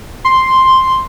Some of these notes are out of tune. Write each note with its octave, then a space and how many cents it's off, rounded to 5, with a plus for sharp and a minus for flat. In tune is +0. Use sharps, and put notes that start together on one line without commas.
C6 +0